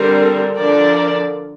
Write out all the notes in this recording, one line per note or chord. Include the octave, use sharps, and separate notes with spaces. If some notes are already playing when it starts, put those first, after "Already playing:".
Already playing: D3 G3 C4 A#4
D3 F3 D4 A#4 D5